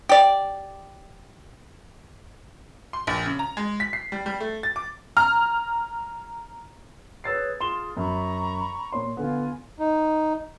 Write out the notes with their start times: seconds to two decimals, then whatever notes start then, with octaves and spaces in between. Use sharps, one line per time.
0.09 G4 D5
2.93 C6
3.07 A#1
3.26 C#3
3.39 A#5
3.57 G#3
3.80 B6
3.93 C7
4.12 G3
4.26 G3
4.40 A3
4.63 A6
4.76 D6
5.17 A#5 F6
7.24 G#4 B4 C#5 E6 A6 C7
7.61 F4 G#4 C6 E7 G7
7.97 F#2 A#5 B5 C#6
8.93 A#2 C#5 C6
9.17 D3 B3 F4 G#5
9.79 D#4